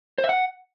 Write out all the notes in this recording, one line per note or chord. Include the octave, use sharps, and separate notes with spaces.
C5
E5
F#5